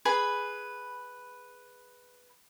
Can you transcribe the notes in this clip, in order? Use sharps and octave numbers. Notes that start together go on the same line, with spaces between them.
G#4 B4 B5